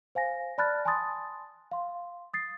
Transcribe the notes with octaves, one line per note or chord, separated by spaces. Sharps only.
C5 F5 G#5 A#6
D5 A5 B5 F6 F#6 A6
G#5 A5 B5 C6 D#6 A6
F5 C6
D#6 A6 C7